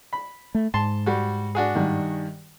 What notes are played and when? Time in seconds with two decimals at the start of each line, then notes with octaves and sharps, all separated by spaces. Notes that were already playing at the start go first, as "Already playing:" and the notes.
0.13 B5
0.55 A3
0.74 G#2 A5 C6
1.06 G3 F#4
1.55 D4 F#4 G#4
1.75 G2 D#3